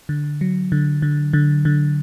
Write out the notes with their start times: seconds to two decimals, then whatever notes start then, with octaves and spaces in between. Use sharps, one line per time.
0.09 D3
0.41 F#3
0.72 D3
1.02 D3
1.33 D3
1.65 D3